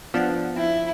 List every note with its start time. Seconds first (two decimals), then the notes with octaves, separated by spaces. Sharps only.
0.14 F3 B3 D4 F#5
0.56 C4 E4